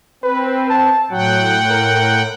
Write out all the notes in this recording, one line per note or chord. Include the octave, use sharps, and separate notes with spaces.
C4 B4
A5
A2 F#3 F#5 G5
A#4